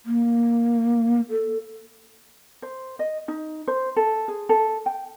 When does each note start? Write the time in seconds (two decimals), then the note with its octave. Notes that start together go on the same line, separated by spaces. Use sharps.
0.06 A#3
1.30 A4
2.62 C5
2.99 D#5
3.28 D#4
3.68 C5
3.96 A4
4.28 G#4
4.49 A4
4.86 G5